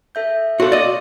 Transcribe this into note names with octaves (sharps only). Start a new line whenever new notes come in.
A4 E5 G6
F#4 A4 C#5 F5 C6
D5 D#5